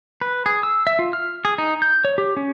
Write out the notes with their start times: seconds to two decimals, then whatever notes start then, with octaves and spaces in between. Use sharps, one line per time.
0.21 B4
0.46 G#4
0.63 E6
0.87 E5
0.99 F4
1.13 F6
1.45 G#4
1.58 D#4
1.82 G6
2.05 C#5
2.18 G4
2.37 C#4